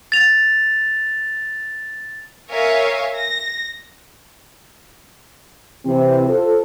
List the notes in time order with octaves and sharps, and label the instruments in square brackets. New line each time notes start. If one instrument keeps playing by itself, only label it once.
[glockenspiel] A6 F7
[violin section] A#4 C#5 E5 F5 G#5
A#6
[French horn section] C3 E3 C4
F4 A4 C5